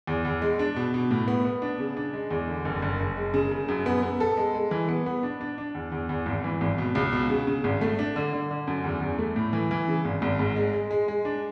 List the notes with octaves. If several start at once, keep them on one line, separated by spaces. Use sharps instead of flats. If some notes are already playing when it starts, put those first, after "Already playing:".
E2
E2
G#3
D4
B2
B2
A2
B3
B3
D4
C#3
D4
G#3
E2
D3
F#1
F#1
F#1
G#3
C#3
C#3
F#2
B3
B3
A4
G#3
G#3
E3
B3
B3
D4
D4
D4
E2
E2
E2
G#1
E3
G#1
B2
C#2
B2
C#3
C#3
G#1
A3
D4
D3
D3
D3
F#2
E2
E2
A3
A2
E3
E3
C#3
G#1
G#1
G#2
G#3
G#3
G#3
G#3
D4